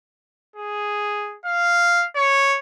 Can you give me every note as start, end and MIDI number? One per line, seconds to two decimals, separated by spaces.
0.56 1.37 68
1.45 2.06 77
2.16 2.59 73